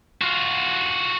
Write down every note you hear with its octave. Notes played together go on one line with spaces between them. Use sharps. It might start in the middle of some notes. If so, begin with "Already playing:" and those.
F4 F#4